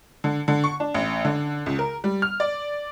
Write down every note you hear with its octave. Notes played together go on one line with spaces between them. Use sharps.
D3
D3
C#6
D4
A1
D3
C#2
A#4
G3
F6
D5